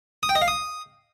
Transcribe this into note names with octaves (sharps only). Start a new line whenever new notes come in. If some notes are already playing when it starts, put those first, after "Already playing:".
D#6
G5
D#5
F5
D#6